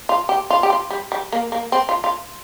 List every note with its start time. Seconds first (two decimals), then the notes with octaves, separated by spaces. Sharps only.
0.09 F4
0.29 G4
0.50 F4
0.63 G4
0.70 F4
0.90 G3
1.12 G3
1.32 A#3
1.52 A#3
1.72 C4
1.89 F4
2.04 F4